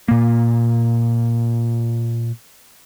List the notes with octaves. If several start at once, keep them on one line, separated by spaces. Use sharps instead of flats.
A#2 A#3